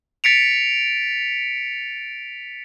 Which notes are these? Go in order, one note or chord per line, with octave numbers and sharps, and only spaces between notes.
A6 B6 C#7 D7 F7